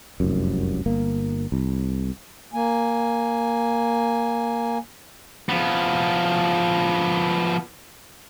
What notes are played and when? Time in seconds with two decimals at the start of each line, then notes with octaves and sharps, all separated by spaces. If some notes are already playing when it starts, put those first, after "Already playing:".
0.20 F1 C2 F#2
0.86 G1 A#3
1.52 C2
2.54 A#3 G#5
5.49 F3 B3